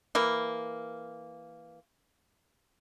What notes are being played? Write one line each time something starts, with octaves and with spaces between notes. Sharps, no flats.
E3 A#3